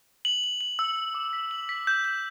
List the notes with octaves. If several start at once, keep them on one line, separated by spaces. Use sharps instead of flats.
F#7
F#7
F#7
E6
F#7
D6
B6
F#7
B6
G6
G6